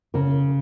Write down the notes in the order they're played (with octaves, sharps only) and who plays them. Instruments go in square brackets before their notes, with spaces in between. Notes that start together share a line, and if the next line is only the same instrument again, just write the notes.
[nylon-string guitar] C#3 A#4